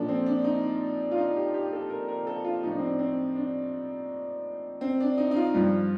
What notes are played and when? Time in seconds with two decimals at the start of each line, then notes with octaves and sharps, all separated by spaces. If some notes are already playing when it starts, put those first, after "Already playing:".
Already playing: A#2 F3 D4 A4
0.08 C4
0.26 D4
0.45 D#4
1.11 F4
1.18 D#4
1.36 G4
1.54 G4
1.73 A4
1.90 A#4
2.08 A#4
2.27 A4
2.44 F4
2.63 A2 F3 D#4
2.71 D4
2.78 C4
2.86 D4
2.99 C4
3.36 D4
4.81 C4
5.00 D4
5.17 D#4
5.31 D#4
5.36 F4
5.55 G2 F3